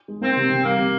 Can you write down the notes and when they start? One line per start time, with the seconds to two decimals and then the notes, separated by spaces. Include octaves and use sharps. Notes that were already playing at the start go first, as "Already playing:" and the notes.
0.08 G#3
0.21 A#3 C4
0.37 C3
0.50 C3
0.65 G3 A#3
0.79 C3